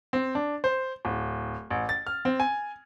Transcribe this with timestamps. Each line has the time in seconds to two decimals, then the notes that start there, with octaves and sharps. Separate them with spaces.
0.13 C4
0.35 D4
0.64 C5
1.05 D1
1.70 A1
1.89 A6
2.07 F6
2.25 C4
2.40 G#5